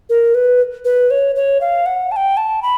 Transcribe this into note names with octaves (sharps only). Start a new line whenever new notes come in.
A#4
B4
B4
C#5
C#5
F5
F#5
A5
G5
A5
B5